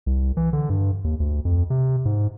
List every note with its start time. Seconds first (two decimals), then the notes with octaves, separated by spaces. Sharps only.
0.06 C2
0.37 E3
0.53 D3
0.69 G2
1.04 D#2
1.20 D2
1.45 F2
1.70 C3
2.05 G#2